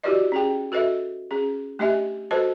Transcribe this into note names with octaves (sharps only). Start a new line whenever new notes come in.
E4 F#4 G4 B4 D5 D#5
C#4 G#4 G5
F#4 A4 B4 D#5 E5
C#4 G#4
A3 D4 G4 D#5 E5 G#5
F#4 A4 B4 C5 D#5 A5